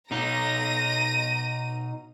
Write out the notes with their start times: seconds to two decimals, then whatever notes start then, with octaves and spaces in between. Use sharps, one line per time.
0.11 B2 D#4 A#5 A#6 D#7